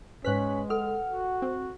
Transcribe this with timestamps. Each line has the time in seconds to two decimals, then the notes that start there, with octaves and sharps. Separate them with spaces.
0.25 G#2 G#3 C#4 B4 F#6 B6
0.70 A4 F#5 F6
1.07 F#4
1.42 C4